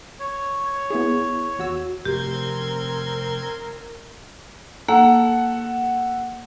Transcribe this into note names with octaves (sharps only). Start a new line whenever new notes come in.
C#5
B3 E4 G#4
E2 F#4 E6
F1 C4 G4 A#4 C6 G#6
A#3 A4 F#5